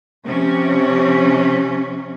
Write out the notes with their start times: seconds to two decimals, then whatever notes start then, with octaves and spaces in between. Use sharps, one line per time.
0.25 C3 F3 C#4